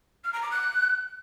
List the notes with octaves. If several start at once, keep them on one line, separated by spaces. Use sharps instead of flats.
F6
A#5
D6
F#6